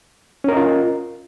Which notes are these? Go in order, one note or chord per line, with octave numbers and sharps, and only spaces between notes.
C#4 F4 A#4 D#5